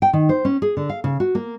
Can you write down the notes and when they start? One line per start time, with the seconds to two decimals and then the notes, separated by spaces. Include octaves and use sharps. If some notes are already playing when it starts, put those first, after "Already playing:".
0.02 G5
0.13 D#3
0.29 C5
0.45 C#4
0.62 G#4
0.77 D3
0.89 F5
1.04 C#3
1.20 F#4
1.35 A#3